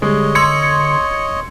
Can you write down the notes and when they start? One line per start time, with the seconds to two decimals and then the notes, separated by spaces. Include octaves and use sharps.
0.02 D3 G3 G#3 C#5 D#5
0.35 C6 E6 G#6 C#7